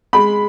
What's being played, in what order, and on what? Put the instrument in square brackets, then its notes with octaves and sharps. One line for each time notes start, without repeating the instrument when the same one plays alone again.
[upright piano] G#3 B5